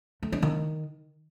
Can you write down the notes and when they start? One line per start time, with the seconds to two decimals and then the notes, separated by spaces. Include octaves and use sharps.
0.23 A3
0.32 D4
0.42 D#3